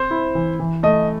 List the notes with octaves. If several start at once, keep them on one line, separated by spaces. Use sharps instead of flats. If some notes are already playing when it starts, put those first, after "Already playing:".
Already playing: C4 C5
E4
E3
E3
A3 D#5